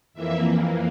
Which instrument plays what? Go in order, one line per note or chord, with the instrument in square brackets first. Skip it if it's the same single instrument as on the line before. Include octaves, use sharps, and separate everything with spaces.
[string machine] F2 E3 A#3 E5